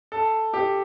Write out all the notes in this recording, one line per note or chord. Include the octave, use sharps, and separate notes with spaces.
A4
G4